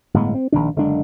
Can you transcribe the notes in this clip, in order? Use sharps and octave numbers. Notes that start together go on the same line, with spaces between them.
G1 A2 G#3 B3
C4
A#1 E2 D#3 D4
F#1 D3 G#3 D4